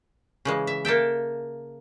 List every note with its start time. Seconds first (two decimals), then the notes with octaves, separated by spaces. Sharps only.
0.45 C#3 E3 G#3
0.67 E5
0.85 A#3 A4 E5 G5